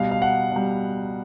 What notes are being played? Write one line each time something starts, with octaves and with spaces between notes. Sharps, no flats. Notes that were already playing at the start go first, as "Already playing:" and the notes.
Already playing: B2 G3 F5
F5
F#5
B2 G3